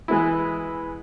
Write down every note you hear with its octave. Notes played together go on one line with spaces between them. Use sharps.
E3 G#3 B3 E4